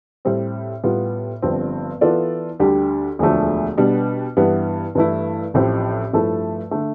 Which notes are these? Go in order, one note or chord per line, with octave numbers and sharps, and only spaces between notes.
A2 G3 C4
A2 G3 B3 F4
G1 G2 F3 C4
E3 B3 F4 A4 D5
D2 D3 G3 D4 G4
E1 D2 D3 F3 A3
B2 G3 B3 D4
G2 E3 G3 B3
G2 E3 A3 E4
A1 A2 F3 C4 G4
G2 F3 A3 E4 A4
D3 A3